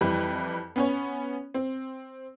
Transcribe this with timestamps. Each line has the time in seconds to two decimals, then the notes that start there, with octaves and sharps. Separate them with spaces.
0.01 F2 E3 G3 B4 B5
0.76 B3 C#4 C#5
1.54 C4